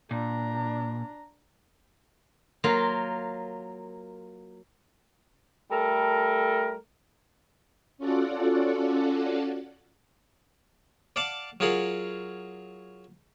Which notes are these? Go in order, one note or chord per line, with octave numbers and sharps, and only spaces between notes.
A#2 D4 A#5
F#3 A#3 F4
G3 A3 A4 A#4
C#4 F4 F#4 A4 D5 F#5
D5 F5 F#5 A5 D6
F#3 F4 G#4 A#4 F#5